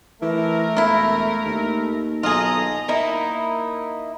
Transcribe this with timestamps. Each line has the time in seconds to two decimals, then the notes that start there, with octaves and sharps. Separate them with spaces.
0.22 E3 A3 A#4
0.77 E1 A#3 E4
1.45 D#2
2.23 B1 F4 G#4 A4 D#5 A#5
2.88 A#3 D#4 E4